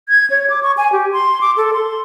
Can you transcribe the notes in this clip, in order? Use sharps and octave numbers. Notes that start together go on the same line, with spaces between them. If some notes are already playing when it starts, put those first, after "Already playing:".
G#6
C#5
D6
C#6
G#5
G4
C6
D6
A4
C6